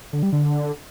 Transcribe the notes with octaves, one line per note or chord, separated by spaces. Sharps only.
D3
G3
D3